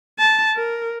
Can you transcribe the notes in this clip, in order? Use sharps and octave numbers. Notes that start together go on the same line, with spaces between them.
A5
A#4